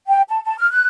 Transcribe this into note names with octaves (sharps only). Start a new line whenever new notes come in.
G5
A5
A5
F6
F#6